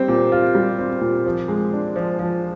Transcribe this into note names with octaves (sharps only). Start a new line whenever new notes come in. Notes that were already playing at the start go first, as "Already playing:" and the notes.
Already playing: G3 C4
A#2
F4
G3
C4
A#2
F3
G#3
D4
F3
F3